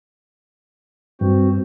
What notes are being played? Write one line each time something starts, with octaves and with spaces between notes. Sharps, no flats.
G2 C4 F#4 C5